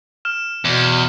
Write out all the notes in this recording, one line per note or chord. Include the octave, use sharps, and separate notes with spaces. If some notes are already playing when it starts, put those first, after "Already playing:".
F6 E7
E2 B2